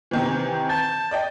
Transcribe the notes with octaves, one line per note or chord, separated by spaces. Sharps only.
C3 D#3 E3
A5 G6
D5 D#5 G5